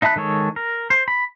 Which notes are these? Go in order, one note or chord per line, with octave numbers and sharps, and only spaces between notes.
D#4 E5 A5 B5 F#6
D#3 G#3 A4 C#5
A#4
C5
B5